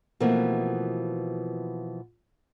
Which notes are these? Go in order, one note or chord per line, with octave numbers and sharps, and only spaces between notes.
B2 E3 F3 A3 A#3 C4